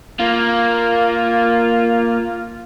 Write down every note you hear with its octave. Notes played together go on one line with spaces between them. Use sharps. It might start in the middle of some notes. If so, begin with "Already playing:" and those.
A#3 F4